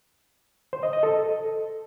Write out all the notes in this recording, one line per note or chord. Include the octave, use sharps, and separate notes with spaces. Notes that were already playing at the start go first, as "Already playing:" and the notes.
C5
D#5
D#5
A4